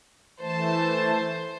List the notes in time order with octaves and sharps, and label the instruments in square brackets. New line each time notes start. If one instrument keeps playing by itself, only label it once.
[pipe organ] E3 A3 A5 [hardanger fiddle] C5